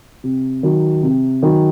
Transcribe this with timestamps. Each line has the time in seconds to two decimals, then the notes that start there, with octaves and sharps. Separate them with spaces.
0.24 C3
0.63 D#3 F#3
1.03 C3
1.42 D#3 F#3